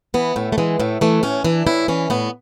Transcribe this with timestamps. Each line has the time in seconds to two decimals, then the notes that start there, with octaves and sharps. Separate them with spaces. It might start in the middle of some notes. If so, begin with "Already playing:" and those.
0.14 E3 B3
0.36 A2 A3
0.52 A3
0.58 E3 G#3
0.80 A2 A3
1.01 E3 A3
1.23 A2 C#4
1.44 E3 D4
1.67 A2 E4
1.88 E3 C#4
2.10 A2 B3